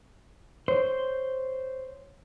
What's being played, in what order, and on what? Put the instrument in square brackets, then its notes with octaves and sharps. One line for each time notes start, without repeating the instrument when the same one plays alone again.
[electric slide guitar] C5 [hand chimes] C#5